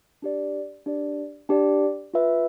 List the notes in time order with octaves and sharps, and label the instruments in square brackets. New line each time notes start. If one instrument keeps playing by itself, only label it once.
[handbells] D4 G4 D5
D4 G4 D5
D4 G4 D5
F4 B4 E5